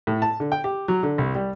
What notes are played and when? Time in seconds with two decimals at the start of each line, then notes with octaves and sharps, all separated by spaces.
0.07 A2
0.22 A5
0.40 D3
0.52 G5
0.64 G4
0.88 F#3
1.03 D3
1.18 C2
1.35 G3